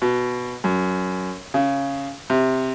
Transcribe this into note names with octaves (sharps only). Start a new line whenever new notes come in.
B2
F#2
C#3
C3